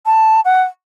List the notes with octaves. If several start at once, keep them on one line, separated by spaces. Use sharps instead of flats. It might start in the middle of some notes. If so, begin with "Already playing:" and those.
A5
F#5